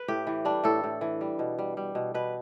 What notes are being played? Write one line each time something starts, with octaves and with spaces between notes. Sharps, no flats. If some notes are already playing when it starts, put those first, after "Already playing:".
Already playing: B4
A2 G4
E3
G3 D4
A2 A4
A2
E3
G3
B2
G3
G3
B2
B2 B4